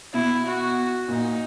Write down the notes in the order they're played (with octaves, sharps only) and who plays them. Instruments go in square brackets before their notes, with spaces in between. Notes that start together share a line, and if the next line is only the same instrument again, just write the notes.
[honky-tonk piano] B2 [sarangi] E4
[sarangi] F#4
[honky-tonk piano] A#2 [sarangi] D#4